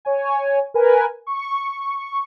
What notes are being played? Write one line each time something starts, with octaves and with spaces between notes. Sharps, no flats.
C#5 G#5
A#4 B4 G#5
C#6